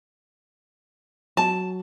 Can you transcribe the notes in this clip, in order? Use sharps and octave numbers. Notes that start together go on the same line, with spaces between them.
F#3 A5